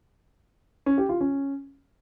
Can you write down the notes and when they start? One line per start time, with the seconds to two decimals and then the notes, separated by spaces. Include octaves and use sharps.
0.86 C#4
0.98 G4
1.09 F4
1.21 C#4